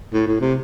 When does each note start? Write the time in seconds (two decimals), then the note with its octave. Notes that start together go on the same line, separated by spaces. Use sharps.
0.13 A2
0.27 A2
0.41 C3